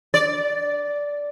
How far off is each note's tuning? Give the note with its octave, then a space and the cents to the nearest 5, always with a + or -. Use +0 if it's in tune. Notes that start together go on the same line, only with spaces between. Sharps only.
D5 -10